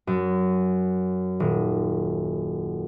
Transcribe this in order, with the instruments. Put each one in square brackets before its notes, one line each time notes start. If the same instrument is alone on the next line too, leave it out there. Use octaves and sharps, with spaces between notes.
[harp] F#2
D#1